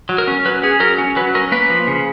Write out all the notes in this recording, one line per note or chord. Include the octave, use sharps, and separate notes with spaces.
F#3
A#4
C#4
F#3 B4
C#4 G#4
F#3 A#4
C#4
F#3 B4
C#4 A#4
A#3 B4
F3
C#3